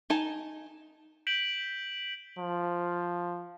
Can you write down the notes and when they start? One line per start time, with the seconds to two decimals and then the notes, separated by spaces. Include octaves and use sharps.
0.10 D#4 G#5 A5
1.27 G6 B6 D7 E7 F#7 G7
2.39 F3